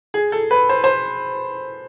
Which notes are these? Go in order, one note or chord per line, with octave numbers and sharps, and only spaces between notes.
G#4
A4
B4
C5
C5